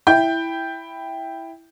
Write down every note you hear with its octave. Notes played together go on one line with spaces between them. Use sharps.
E4 G5 G6